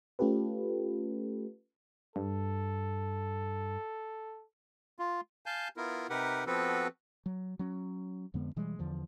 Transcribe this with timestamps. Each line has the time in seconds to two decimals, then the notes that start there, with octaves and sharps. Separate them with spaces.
0.19 A3 C#4 F4 G4 A4 B4
2.16 G2 A4
4.99 F4
5.46 F5 G#5 A5 G6
5.77 B3 E4 F4 A#4
6.10 C3 D#4 G4 A#4 B4 F#5
6.46 F3 B3 C4 F#4 A4 B4
7.26 F#3
7.59 F#3 C#4
8.34 F2 D3 G#3 B3
8.56 B2 E3 G3 G#3
8.79 E2 D3 F3